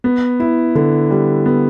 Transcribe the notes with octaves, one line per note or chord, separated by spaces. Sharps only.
B3
E4
D3
G3
B3